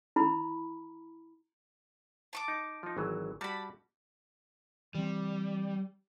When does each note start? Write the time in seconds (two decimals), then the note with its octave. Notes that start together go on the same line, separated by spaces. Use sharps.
0.16 E4 A#5 B5
2.33 A5 C#6 D6
2.48 D#4
2.83 F3 D#4
2.97 G#1 E3 F#3
3.41 G3 F#4 D5 A5 B5
4.95 E3 G3 C4